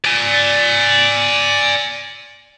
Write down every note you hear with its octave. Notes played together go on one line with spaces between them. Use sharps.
D5 G#5